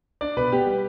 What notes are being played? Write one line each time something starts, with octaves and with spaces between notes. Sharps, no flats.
D4 D5
B2 B4
B3 G4
G3